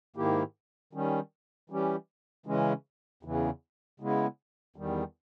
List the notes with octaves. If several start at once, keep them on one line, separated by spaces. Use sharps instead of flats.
G#2 D#3 A#3 E4 G4
D#3 G3 C#4
E3 G3 C#4 G4
C#3 E3 G#3 C#4
E2 C#3 E3
C#3 G#3 B3 E4
E2 D#3 G3